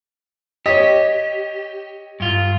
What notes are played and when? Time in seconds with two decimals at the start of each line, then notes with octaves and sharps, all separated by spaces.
0.66 G4 C#5 D#5
2.20 G2 F4